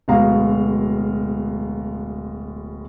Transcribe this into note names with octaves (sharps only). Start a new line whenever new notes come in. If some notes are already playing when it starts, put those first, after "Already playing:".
D1 B2 G#3 F5 A#5